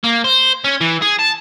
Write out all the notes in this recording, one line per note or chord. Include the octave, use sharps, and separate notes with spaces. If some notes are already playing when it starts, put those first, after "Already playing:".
A#3
C5
C#4
E3
G#4
A5